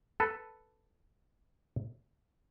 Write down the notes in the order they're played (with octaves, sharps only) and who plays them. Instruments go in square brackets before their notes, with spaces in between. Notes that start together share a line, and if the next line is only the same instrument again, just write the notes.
[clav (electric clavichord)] A4 B4